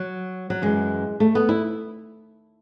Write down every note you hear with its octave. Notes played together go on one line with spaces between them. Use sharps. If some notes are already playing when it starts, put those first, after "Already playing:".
Already playing: F#3
F#3
F#2 E3 G#3
A3
B3
E4